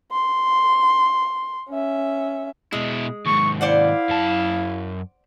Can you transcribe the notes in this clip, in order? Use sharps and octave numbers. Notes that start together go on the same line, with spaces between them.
C6
C#4 E5
B2 G#3 E4
D#2 G#2 C#6
E4 C5 D5 F5 F#5
F#2 A5